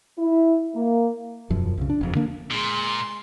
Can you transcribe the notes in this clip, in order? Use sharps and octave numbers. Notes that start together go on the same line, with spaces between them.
E4
A#3
E1 F#2 F3
C2 C#3
D4
F#1 F2
D3 A#3 D4
A#2 G#3 C6